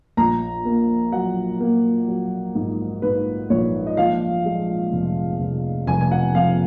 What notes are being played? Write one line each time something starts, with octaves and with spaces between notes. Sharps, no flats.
A#1 A#5
A#3
F#3 F#5
A#3
F#3
G#2
G#2 B4
A#1 C#5
D#5
F3 F5
G#3
F1
F1
F1 G#5
G#5
F#5
F2 F5